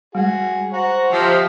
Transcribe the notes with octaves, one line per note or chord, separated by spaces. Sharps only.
G3 G#3 F#4 G#4
C5 F#5 A#5 C#6
F3 G4 D#5 E5